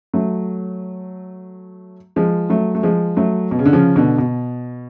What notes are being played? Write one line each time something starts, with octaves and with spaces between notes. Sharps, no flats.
F#3 A3
F3 G#3
F#3 A3
A3
F3 G#3
F#3 A3
B2
C#3
D3
C#3 F3
B2 D3
B2